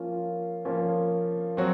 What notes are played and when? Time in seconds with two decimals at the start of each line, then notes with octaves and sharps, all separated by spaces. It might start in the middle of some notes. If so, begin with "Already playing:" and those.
Already playing: F3 A#3 C#4 F4
0.65 F3 A#3 C#4 F4
1.57 F#3 C4 F#4